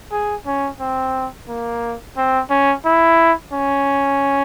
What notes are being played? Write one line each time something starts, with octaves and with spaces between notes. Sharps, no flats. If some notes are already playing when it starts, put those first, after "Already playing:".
G#4
C#4
C4
A#3
C4
C#4
E4
C#4